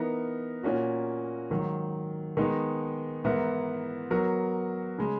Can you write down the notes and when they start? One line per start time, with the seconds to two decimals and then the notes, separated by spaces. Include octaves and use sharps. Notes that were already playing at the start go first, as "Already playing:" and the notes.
Already playing: E3 B3 D#4 A#4
0.63 A#2 A#3 C#4 F#4
1.50 G#2 D#3 F#3
2.37 D#3 G#3 B3 D#4
3.24 G#2 E3 B3 E4 A#4
4.10 F#3 B3 F#4 A#4
4.98 C#3 G#3